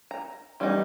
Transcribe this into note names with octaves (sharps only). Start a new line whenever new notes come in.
A#5
E3 G3 A3 B3 D#4